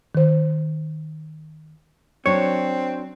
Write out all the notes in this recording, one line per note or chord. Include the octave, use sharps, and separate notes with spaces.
D#3 C5
F#3 C4 D4 C#5